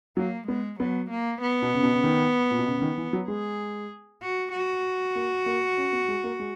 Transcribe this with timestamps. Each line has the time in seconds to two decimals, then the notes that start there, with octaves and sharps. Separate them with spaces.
0.17 F#3 A#3
0.48 G#3 B3
0.80 F#3 B3
1.10 A#3
1.42 B3
1.62 B2
1.74 C#3
1.83 B2
1.94 C#3
2.04 D#3
2.51 A#2
2.59 B2
2.66 C#3
2.78 C#3
2.82 D#3
2.98 E3
3.13 F#3
3.28 G#3 G#4
4.22 F#4
4.52 F#4
5.15 A#3
5.46 A#3
5.77 C#4
5.93 B3
6.08 G#3
6.24 A#3
6.39 G#3